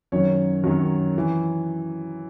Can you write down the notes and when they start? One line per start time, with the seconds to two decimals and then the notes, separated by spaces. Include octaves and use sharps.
0.12 F#2 D#3 F#3 C#5
0.64 F#2 D#3 F#3
1.18 E3